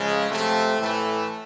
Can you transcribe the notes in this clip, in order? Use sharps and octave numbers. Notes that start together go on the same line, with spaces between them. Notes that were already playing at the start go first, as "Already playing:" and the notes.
Already playing: C#3 F3 G#3
C3 F3 A3
A2 E3 A3